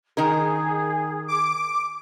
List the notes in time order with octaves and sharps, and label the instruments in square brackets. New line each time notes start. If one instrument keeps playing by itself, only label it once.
[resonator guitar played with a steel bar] D#3 D#4 A#4 [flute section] G#4
[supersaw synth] D6